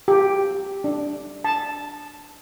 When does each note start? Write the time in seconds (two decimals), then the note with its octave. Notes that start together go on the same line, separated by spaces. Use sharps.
0.08 G4
0.84 D4
1.44 A5